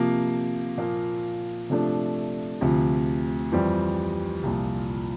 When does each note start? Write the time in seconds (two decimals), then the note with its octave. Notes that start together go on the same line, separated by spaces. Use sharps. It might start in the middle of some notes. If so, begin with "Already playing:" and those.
Already playing: C3 F3 A#3
0.78 A#2 F3 A#3
1.70 C3 F3 A3 D4
2.61 D2 C3 F3
3.52 F2 E3 G3 C4
4.43 C2 A#2 F3